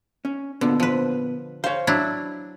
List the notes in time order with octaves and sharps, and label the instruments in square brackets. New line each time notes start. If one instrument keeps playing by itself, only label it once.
[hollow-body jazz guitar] C#4
[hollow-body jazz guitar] A#2 B3 [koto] D3
[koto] F3 B4
[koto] C5 [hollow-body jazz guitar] C#5 F5
[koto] F#3 D4 E4